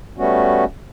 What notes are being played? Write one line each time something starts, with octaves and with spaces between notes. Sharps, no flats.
G3 A3 B3 C#4 F#4